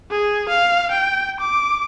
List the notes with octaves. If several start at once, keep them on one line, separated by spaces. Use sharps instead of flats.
G#4
F5
G5
D6